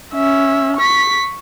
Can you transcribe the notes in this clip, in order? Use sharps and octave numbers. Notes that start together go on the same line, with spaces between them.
C#4 E5
C#6 B6